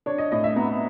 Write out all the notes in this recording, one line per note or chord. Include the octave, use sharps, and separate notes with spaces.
D4 C#5
D#5
A2 D#5
E5
B3 A#5